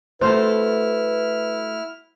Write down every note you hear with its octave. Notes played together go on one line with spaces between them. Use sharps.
A3 E4 F#4 A4 B4 C5 F6